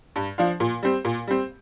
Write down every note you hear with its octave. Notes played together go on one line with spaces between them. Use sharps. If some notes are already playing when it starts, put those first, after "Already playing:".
G2
F3 D4 F4
A#2
G3 C4
A#2
G3 C4